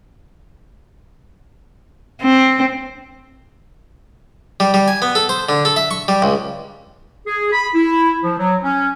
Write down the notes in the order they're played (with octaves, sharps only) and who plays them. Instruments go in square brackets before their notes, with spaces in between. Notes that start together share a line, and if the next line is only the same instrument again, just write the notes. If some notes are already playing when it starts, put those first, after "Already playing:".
[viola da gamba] C4
[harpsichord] G3
G3
G#5
B3
A4
C5
D3
A4
E5
C#6
G3
C#2
[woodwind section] G#4
B5
E4
F3
F#3
C#4